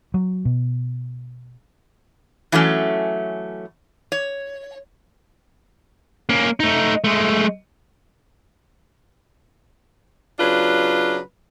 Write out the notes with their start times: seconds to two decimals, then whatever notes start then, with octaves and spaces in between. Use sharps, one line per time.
0.14 F#3
0.45 B2
2.52 E3 F#3 A3 C#4
4.12 C#5
6.29 A#3 C#4
6.60 A3 D#4
7.04 G#3 A3
10.40 C#3 F#3 D4 F4 B4